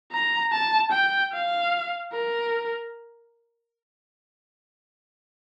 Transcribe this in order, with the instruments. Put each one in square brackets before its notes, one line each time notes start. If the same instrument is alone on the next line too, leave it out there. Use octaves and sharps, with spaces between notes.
[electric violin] A#5
A5
G5
F5
A#4